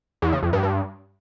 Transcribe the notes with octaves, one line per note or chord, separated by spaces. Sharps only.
E2
C#3
F2
G2
G2